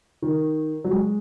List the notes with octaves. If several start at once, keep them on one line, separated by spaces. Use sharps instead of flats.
D#3
F#3
G#3